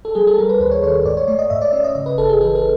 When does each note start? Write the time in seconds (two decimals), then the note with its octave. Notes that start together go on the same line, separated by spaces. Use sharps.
0.05 A4
0.15 G3 G#4
0.27 A4
0.38 G3 A#4
0.49 B4
0.60 D#2 C5
0.71 C#5
0.83 D#3 C#5
0.94 C#5
1.05 G#2 D5
1.17 C#5
1.28 A3 D5
1.39 D#5
1.50 G#2 E5
1.61 D5
1.73 C#4 D5
1.84 D#5
1.95 C#3 D#5
2.06 B4
2.18 G1 A4
2.29 G#4
2.40 E3 A4
2.55 A4